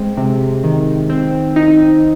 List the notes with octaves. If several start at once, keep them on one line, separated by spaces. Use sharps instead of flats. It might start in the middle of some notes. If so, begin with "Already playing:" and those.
Already playing: G#3 C4
C3
D#3
C4
D#4